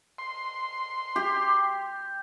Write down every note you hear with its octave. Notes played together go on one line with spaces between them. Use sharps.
C6
G4